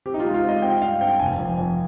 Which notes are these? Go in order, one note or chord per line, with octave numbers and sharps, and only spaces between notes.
C4 G4
D#4
F4
G#3
F4
C4
D#5
C4 G5
G2 F5
C4 G5
F1 G#5
F2
F2